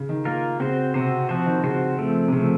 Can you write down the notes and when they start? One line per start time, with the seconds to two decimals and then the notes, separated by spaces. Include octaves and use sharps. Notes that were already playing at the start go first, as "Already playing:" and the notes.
Already playing: C#3
0.09 D#3
0.25 A#3 F4 A#4
0.60 C#3 C4 F#4 C5
0.94 C3 C4 F#4 C5
1.29 F3 C4 F#4 C5
1.46 D#3
1.63 C#3 C4 F#4 C5
1.98 F3 A3 C4
2.28 C3
2.33 C#3 F3 A3 C4